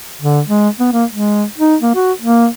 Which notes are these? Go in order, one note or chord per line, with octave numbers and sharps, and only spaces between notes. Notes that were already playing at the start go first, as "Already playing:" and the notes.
D3
G#3
B3
A#3
G#3
D#4
A#3
F#4
A#3